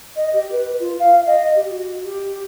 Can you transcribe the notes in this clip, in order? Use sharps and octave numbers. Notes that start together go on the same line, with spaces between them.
D#5
G4
B4
F4
F5
D#5
G4
F#4
G4